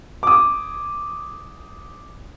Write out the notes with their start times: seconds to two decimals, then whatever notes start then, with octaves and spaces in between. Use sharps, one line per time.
0.23 D6 D#6